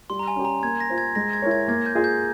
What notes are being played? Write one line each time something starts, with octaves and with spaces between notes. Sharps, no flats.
G3 C6
A#5
G#5
C#4 G4
A#5
A#3 G#6
A#6
F4 C5
G#6
G#3 A#6
G#6
E4 A#4 C#5
G#6
A#3 G#6
G6
F4 G#4
G6